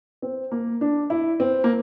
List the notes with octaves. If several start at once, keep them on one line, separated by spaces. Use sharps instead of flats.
C4
A#3
D4
E4
C4
A#3